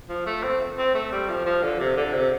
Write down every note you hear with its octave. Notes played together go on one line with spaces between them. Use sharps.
F3
A3
C4
C4
A3
G3
F3
F3
D3
C3
D3
C3